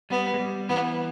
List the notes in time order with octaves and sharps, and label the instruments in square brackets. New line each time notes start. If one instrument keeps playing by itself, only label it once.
[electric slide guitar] G3 [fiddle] B3
[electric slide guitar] G#3
G3
[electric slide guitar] E3 [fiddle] B3